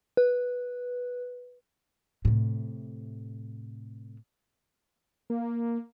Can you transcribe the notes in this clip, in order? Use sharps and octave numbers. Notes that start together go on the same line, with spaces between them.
B4
A2 C3
A#3